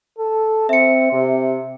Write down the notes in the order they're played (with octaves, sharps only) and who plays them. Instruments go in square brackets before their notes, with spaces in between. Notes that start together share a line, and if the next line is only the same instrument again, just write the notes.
[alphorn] A4
[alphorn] C4 [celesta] E5 C#7
[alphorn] C3